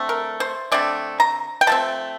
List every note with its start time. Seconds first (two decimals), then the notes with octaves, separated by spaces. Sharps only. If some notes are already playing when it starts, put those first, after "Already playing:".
Already playing: D3 A3 C4
0.09 A#4
0.40 C5
0.72 D3 A3 C4 D5
1.20 A#5
1.61 G5
1.67 F3 A3 C4 A5